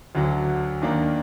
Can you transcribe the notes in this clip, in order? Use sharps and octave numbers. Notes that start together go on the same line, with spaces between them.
D2 D3 F#3
D#2 D#3 A#3 D4